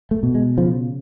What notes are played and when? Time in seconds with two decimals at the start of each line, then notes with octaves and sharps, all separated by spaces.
0.11 A3
0.23 B2
0.35 G#3
0.57 C#3 F3